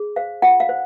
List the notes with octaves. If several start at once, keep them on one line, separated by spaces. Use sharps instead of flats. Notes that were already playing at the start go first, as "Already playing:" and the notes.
Already playing: G#4
C5 F5
F4 F#5
F5
C5